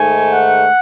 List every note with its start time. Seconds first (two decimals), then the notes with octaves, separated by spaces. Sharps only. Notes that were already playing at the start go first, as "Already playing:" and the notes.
Already playing: G#2 D#3 A3 G#5
0.32 F#5